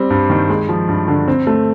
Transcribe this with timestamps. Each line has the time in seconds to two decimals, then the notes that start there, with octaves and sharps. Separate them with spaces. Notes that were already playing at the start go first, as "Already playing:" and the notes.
Already playing: G3 C4
0.10 G2
0.30 D#3
0.49 G#3
0.69 F3
0.88 G2
1.08 D3
1.28 C4
1.47 A3